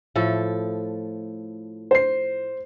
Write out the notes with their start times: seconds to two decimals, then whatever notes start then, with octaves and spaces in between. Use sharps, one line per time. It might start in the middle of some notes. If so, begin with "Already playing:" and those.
0.15 A2 F3 A4
1.91 C5 C7